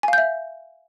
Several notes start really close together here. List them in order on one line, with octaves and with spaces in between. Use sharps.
G#5 F5 G6 E5